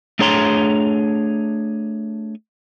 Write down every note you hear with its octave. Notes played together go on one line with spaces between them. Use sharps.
A3 D4 G#4 C#5 A#5 C6